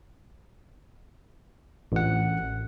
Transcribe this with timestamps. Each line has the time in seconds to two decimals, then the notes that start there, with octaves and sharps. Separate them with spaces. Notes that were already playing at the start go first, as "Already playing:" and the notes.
1.92 A1 F#5